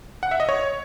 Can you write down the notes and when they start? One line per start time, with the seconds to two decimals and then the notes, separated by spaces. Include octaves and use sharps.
0.23 F#5
0.31 E5
0.40 D#5
0.49 C#5